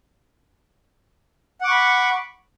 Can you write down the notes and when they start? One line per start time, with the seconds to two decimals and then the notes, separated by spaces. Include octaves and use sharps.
1.61 F#5
1.64 D6
1.68 C#6
1.71 B5